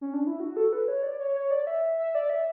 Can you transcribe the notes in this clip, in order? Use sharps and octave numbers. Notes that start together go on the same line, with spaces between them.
C#4
D4
E4
F#4
A4
B4
C#5
D5
C#5
C#5
D5
E5
E5
D5
E5